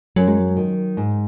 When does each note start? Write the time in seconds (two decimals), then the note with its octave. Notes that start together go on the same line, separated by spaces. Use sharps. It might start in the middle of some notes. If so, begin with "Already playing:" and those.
0.16 F#2 F#3
0.28 G#3
0.40 F#3
0.57 D#3
0.97 G#2 G#3